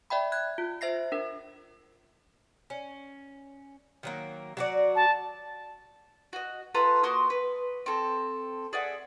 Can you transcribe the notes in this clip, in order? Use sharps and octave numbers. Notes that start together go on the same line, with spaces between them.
D5 E5 G5 B5
F#6 G#6
F4
C5 E5 A#6 C7
D4 A#4
C#4
D#3 F#3 A#3
F#3 F#4 D5
A5
F#4 D#5
F4 A4 B4 A#5
A#3 F#4 C6 D#6
B4
C4 A4
G#4 D5 E5 F#5